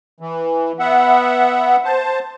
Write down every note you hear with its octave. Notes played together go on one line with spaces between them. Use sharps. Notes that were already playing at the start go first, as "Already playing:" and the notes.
E3
B3 E5 F#5
C5 A5